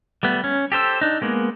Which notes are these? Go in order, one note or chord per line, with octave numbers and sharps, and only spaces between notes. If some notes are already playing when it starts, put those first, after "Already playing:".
G3 A3 B3
C#4
G4 A4 C5 E6
D4 D#4
G#3 A#3 B3